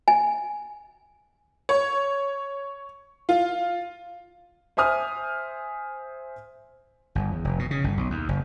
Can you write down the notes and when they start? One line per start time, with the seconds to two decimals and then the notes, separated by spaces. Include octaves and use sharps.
0.08 G#5
1.69 C#5
3.29 F4
4.77 C5 E5 G#5 D#6 F6
7.15 G1
7.32 E2
7.44 F1
7.59 B2
7.71 C#3
7.84 G1
7.97 B1
8.10 D#2
8.28 F#1